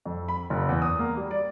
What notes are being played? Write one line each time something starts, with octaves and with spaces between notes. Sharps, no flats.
F2
B5
F#1
E2
D#6
A#3
G3
D5